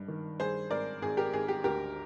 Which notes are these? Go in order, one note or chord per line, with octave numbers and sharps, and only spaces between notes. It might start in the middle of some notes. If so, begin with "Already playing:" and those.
Already playing: G#1 G2
D#3
G2 G#4 C5
G#1 A#4 D5
G#1 G#4
G4 A#4
G#1 G#4
G4
D2 G4 A#4